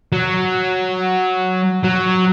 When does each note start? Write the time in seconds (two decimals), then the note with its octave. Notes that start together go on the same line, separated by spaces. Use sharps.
0.12 F#3
1.83 F#3